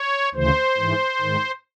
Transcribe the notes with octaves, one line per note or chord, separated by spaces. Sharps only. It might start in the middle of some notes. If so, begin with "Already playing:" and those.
Already playing: C#5
D2 C#3 E3 C5
G#2 E3
G#2 D#3